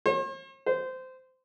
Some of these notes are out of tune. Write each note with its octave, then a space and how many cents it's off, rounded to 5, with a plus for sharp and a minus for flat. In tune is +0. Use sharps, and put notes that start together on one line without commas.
C5 +45
C5 -20